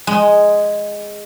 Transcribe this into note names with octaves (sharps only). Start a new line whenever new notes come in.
G#3